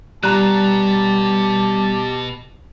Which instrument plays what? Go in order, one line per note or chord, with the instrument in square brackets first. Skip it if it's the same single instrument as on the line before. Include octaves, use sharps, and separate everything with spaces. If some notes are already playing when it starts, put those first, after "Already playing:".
[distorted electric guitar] B2 [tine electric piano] G3 [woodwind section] G4 A5 [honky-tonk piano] A#5 F#6